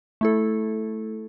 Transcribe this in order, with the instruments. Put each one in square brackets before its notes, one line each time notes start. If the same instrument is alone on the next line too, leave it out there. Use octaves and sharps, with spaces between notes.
[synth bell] A3 E4 A4